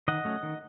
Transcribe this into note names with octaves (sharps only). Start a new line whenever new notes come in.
D#3 D#5 F#5
F#3 A3 C#4
D#3